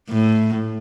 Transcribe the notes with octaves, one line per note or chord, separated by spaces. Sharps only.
A2